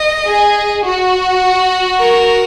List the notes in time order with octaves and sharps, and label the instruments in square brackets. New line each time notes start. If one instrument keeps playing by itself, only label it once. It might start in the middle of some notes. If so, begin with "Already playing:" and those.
Already playing: [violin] D#5
[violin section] G#4
F#4
[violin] A#4